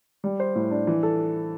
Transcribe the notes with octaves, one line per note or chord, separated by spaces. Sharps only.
G3
C5
A2
D4
E3
A4